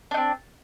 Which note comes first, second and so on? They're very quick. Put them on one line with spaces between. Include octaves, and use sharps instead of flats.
D4 D#4 C4